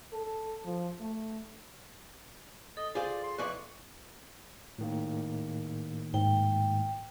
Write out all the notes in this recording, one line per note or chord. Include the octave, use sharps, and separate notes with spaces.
A4
F3
A3
A4 D#5
F4 G#4 C5 D5
C6
F2 E3 D5 C#6 F#6
A2 D#3 A#3
G#2 G5